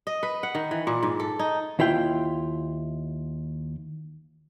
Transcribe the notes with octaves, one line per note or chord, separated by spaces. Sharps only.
D#5
B4
F#5
D#3
E3
A#2
G#2
A4
D#4
D#2 E4 F4 G5